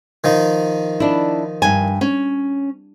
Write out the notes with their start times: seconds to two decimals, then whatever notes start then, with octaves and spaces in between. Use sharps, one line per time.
0.24 D#3 F3 D#4
1.00 D4 E4
1.62 G2 G#5
2.01 C#4